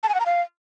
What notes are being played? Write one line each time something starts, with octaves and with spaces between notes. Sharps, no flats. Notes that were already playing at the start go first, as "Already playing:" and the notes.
A5
G#5
F#5
A#5
F5